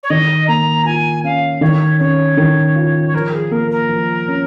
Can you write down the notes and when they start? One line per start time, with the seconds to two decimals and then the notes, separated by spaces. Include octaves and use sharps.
0.03 C#5
0.10 D#3 D#5
0.47 A#3 A#5
0.85 F4 G#5
1.24 C#4 F5
1.61 D#3 C#5
2.00 C#4 C#5
2.37 D#3
2.75 F4
3.06 C#5
3.13 F3 A#4
3.33 G#4
3.51 A#3 A#4
3.70 A#4
3.89 F3
4.28 C#4